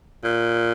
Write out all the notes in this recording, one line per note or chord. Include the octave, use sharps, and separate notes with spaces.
A#2